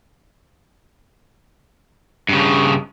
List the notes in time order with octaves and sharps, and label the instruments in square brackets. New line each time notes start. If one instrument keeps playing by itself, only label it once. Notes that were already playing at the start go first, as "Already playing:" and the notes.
[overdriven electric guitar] G2 C#3